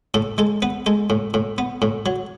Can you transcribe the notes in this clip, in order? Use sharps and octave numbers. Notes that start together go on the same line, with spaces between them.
A2 A4
G#3 A4
B3 B4
G#3 A4
A2
A2
B3
A2
F#3